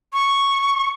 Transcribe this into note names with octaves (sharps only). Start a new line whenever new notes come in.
C#6